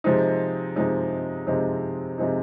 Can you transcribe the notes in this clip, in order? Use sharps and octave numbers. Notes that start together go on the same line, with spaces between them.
C3 F3 G#3 C4 D#4
C3 F3 G#3 C4 D#4
C3 F3 G#3 C4 D#4
C3 F3 G#3 C4 D#4